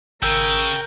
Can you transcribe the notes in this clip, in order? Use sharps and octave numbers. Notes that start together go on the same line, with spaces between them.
G#1 C#3 A#4 G5 E6